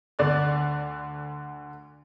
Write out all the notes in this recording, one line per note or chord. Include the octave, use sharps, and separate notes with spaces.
D2 D3 D5 F#6